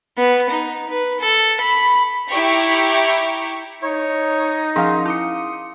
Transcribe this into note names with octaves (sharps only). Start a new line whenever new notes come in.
B3
D#4
B4
A4
B5
E4 G4 G5 A#5 C#6
D#4 C#5
F3 C#4 G#4 F5 C6
E4 D6 D#6 C#7